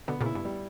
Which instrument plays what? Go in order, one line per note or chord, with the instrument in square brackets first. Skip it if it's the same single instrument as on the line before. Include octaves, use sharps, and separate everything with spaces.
[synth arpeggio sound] B2 D3 [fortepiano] B3
[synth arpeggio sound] A#2 C#3 [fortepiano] E4
[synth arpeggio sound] G2
[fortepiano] G3